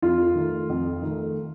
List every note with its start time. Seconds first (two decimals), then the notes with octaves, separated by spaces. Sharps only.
0.02 F2 F4
0.35 D#3 A3
0.69 F2
1.02 D#3 A3